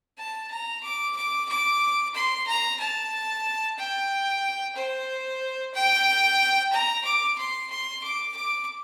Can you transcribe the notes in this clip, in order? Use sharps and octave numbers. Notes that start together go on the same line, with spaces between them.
A5
A#5
D6
D6
D6
C6
A#5
A5
G5
C5
G5
A#5
D6
C6
C6
D6
D6